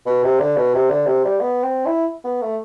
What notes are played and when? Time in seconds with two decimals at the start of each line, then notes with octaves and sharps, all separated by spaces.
0.06 B2
0.23 C3
0.40 D3
0.57 B2
0.74 C3
0.90 D3
1.07 C3
1.24 G3
1.41 B3
1.63 C4
1.86 E4
2.24 B3
2.42 A3